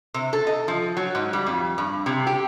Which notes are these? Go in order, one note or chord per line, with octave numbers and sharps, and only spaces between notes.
C3
A4
D#5
F3
F#3
G#2
G3
F2
G2
C3
G4